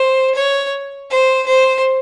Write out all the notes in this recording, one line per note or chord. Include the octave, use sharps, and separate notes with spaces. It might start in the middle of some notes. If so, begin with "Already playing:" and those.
Already playing: C5
C#5
C5
C5